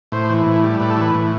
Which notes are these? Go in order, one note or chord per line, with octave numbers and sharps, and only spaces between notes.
A2 C5
E3
A2
G3
A2 B4
A4
E3 B4
A2